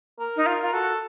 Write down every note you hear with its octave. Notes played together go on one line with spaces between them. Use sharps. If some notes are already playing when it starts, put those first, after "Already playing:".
A#4
D#4
F4
F4
F#4 A4